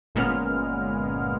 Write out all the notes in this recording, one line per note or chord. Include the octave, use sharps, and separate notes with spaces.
G1 A#2 G#3 B3 C#4 F6